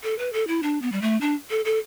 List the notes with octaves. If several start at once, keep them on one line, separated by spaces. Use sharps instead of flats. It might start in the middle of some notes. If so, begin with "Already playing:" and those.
A4
B4
A4
E4
D4
B3
G3
A3
D4
A4
A4